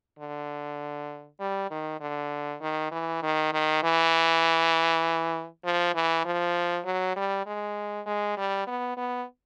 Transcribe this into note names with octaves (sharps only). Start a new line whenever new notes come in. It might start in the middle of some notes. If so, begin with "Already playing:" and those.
D3
G3
D#3
D3
D#3
E3
D#3
D#3
E3
F3
E3
F3
F#3
G3
G#3
G#3
G3
B3
B3